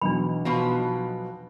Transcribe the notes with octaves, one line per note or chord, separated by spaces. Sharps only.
B1 E2 D4 B5
B2 F3 B4